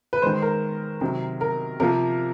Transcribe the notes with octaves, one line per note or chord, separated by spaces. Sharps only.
B4
D#3 G#3 C5
A#4
C3 D#3 F#3
A#4
C3 F3 A#3 A#4